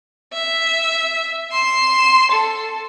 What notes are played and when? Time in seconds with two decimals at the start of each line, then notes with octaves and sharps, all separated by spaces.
0.33 E5
1.52 C6 E7
2.31 A4